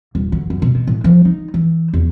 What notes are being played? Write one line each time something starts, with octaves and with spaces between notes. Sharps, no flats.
D#1
D2
F#2
B2
B2
A2
F3
D#4
E3
E2